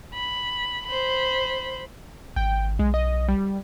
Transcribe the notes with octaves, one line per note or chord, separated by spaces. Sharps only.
B5
C5 B5
G#1 G5
B1 G#3
D#5
G3